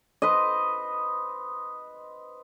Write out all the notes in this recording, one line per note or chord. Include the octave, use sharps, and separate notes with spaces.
B4 C5 D#5